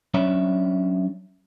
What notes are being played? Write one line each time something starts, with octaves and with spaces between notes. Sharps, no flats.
F#3 C#4 D4 C#5 E5 B5